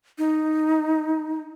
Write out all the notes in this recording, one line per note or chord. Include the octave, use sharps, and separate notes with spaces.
D#4